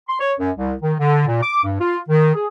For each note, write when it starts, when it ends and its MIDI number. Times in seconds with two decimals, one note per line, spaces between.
0.08 0.20 84
0.20 0.33 73
0.40 0.51 42
0.57 0.73 36
0.82 0.94 51
1.00 1.27 50
1.27 1.42 46
1.42 1.61 86
1.64 1.77 43
1.81 1.98 65
2.09 2.34 51
2.35 2.46 68